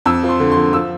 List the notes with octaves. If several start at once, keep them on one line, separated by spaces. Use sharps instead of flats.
F2 E6
F3
C6
D3
F3 C6
F3 E6